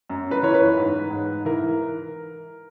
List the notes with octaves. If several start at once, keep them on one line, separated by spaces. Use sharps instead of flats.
F#2
B4
E3 C#5
B4
G#2
G#2
E3 A#4